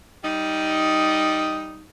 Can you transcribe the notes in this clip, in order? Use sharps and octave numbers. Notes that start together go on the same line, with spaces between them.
G3 D#4